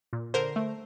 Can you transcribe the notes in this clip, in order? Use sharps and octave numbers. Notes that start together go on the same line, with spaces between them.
A#2
D3 A#4 C5
A3